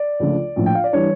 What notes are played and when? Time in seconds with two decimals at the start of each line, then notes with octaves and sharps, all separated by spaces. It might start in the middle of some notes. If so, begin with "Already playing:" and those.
Already playing: D5
0.20 C#2 C#3 F3 A3 D4
0.56 A#1 A2 F3
0.66 G5
0.75 F5
0.84 D5
0.93 E3 G3 D4 C#5